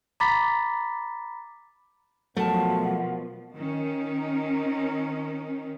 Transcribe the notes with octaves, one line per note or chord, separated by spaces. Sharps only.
A#5 B5 D6 A6 B6
B2 F3 F#3 A3 A#4 F#5 A5
D#3 C#4